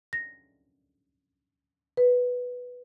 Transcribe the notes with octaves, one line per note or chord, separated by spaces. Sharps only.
A#6
B4